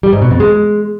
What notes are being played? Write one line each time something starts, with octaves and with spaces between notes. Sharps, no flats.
G3
G#2
B2
F2
G#3